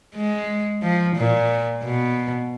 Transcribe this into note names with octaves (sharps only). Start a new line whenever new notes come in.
G#3
F3
A#2
B2